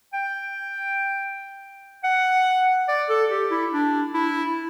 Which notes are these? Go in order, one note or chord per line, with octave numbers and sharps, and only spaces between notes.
G5
F#5
D5
A4
G4
E4
D4
E4